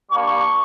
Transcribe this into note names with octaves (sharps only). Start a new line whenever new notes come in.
G3 A#3 D4 C#6